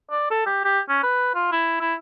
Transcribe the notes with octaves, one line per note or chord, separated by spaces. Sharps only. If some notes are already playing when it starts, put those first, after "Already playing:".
D5
A4
G4
G4
C#4
B4
F4
E4
E4